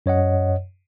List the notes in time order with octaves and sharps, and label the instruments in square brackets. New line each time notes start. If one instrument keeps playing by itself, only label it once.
[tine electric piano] F#2 C#5 D#5 F#5